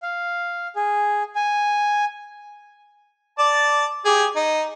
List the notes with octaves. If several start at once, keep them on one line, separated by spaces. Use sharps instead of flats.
F5
G#4
G#5
D5 A5
G4 G#4
D#4